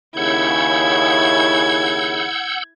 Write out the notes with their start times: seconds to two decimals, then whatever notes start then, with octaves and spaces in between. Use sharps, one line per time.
0.17 D#2 C#3 E4 F#5 E6 G6 G#6